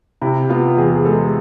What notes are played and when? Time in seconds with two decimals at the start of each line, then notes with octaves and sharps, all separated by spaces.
0.22 C3 E4
0.49 B3 F4
0.77 E2 G#4
1.05 G#3 A4